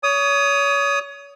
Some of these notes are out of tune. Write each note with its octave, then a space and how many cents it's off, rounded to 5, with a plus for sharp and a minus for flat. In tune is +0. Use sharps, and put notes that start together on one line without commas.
C#5 +30 D#6 +0